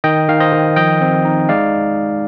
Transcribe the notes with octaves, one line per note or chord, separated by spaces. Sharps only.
D#3 D#5 G5
D#3 F5
C5 D#5
D#3
F3 D#5 G5
C4
D#4
G#3 D5 F5